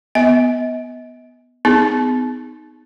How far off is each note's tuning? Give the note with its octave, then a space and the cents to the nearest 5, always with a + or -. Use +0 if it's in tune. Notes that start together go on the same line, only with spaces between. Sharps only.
B3 +0 D#5 +40
B3 +35 D#4 +0 G#4 +0